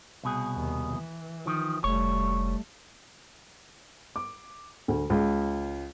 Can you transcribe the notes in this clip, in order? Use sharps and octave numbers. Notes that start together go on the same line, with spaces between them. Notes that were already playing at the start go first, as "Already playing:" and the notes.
C2 B2 G#4
D#2
E3
D#3 F3
F1 G3 A3 C#5
D6
D2
C#2